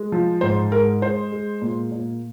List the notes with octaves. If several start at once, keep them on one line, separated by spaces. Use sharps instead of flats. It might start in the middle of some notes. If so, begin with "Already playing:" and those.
Already playing: G#3
F3
G#2 C5
G#3 A#4
G#3 C5
G#3
A#2
A#2